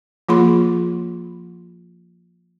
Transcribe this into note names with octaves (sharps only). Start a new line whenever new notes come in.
F3 A#3 F4 G#4 B5 C6